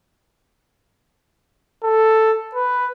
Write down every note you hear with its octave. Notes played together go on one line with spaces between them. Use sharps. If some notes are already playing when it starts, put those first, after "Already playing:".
A4
B4